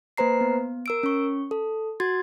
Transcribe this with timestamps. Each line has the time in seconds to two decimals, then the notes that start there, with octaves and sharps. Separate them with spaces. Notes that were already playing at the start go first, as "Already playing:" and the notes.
0.18 A#3 B4 C5 A#5 C7
0.41 B3
0.86 A#4 E6 D7
1.03 C#4 C#6
1.51 A4
2.00 F#4 C6 G#6 A6